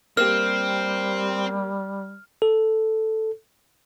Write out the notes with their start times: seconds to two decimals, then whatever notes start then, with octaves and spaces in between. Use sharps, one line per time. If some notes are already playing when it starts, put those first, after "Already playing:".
0.17 G3 A#3 C4 G4 F6
2.42 A4